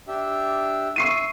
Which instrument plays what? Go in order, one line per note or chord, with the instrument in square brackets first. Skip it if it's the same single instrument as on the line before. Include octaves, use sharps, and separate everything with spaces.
[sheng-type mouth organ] D4 G4 E5
[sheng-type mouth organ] E5 [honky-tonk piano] C#6 C7 D#7